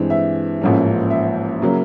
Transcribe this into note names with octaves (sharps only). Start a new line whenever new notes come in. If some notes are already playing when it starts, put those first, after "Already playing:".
Already playing: G2 E3 G#3 C4
E5
A1 G#2 F3 A#3 C#4
E5
C#3 F#3 A#3